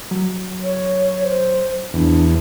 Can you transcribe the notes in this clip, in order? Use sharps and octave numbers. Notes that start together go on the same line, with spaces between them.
F#3
C#5
C5
E2 D4